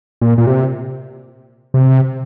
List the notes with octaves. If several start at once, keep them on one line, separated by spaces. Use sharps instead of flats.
A#2
A#2
C3
C3